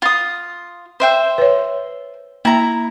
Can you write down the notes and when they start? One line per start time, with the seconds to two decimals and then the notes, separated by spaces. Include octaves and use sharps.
0.02 F4 D#6
1.00 C5 E5 G5
1.38 B4 C#5
2.45 A#3 E4 A#5